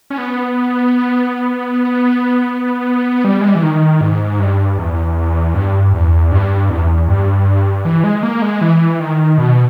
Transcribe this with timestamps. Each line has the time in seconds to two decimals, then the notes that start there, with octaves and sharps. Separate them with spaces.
0.10 C#4
0.18 B3
3.24 G3
3.41 G#3
3.48 G3
3.55 E3
3.63 D#3
4.01 G#2
4.39 G2
4.78 E2
5.54 G2
5.93 E2
6.32 G2
6.70 E2
7.08 G2
7.85 E3
8.04 G#3
8.23 A#3
8.42 G#3
8.61 E3
9.00 D#3
9.38 B2